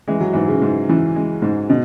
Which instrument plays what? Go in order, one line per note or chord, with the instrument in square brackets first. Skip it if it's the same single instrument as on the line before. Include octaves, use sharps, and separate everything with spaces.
[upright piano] E3 [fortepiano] G#3
[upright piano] F#3
[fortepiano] G#2 [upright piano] E3
[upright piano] C#3
[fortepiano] G#2
E3
G#3
G#2
[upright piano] B2